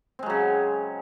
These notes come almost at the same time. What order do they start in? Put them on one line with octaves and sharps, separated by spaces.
C4 G#3 F#3 C#3